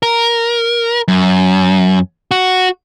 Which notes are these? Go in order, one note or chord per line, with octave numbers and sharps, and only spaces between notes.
A#4
F#2
F#4